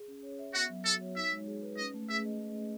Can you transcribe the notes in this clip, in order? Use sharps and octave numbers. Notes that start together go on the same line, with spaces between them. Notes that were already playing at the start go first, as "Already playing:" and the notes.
Already playing: G#4
C#4
C#5
E5
B3 F#4
F#3
F#4 A4
C#5
D#4 E5
G#3
G#4
B4
C#4 D#5
A3
G#4 E5
D#5